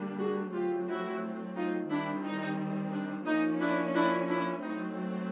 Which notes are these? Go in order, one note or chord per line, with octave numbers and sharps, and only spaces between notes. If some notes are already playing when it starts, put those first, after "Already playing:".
Already playing: D3 G3 A#3 D4
F#4 G#4
F#3 A3 C4 F4 G4
E4 F#4
D#4 F4
D#3 G3 C4 D4 E4
D#4
D4
F3 A#3 C#4 D#4
D4 E4
D4 E4
D4 E4
F#3 A3 C4 D#4